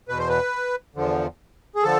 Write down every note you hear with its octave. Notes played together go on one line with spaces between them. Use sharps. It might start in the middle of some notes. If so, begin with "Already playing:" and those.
E2 B2 B4
C5
B4
E2 D3 F3
G#4
D3 F3 A4